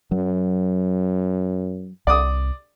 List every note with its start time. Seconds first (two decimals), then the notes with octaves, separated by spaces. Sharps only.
0.11 F#2 F#3
2.07 C2 D5 D6 D#6